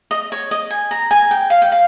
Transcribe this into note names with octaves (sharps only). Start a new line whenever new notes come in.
D#5
C#5
D#5
G#5
A#5
G#5
G5
F5
G5
F5